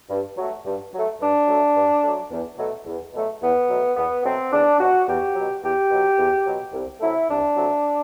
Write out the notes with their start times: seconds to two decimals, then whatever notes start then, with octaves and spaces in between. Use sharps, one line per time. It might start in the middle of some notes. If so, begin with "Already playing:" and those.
0.09 G2
0.37 F#3 A3
0.65 G2
0.93 F#3 A3
1.20 G2 D4
1.48 F#3 A3
1.76 G2
2.03 F#3 A3
2.30 E2
2.58 B2 F#3 A3
2.86 E2
3.13 B2 F#3 A3
3.41 E2 B3
3.69 B2 F#3 A3
3.96 E2 B3
4.24 B2 F#3 A3 C4
4.52 E2 D4
4.80 B2 F#3 F#4
5.07 E2 G4
5.35 B2 F#3
5.62 E2 G4
5.90 B2 F#3
6.18 E2
6.45 B2 F#3
6.73 C2
7.01 C3 F#3 A3 E4
7.28 C2 D4
7.56 C3 F#3 A3